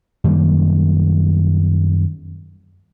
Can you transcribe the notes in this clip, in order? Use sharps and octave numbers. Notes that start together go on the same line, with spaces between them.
F#2 D#3 G3 A#3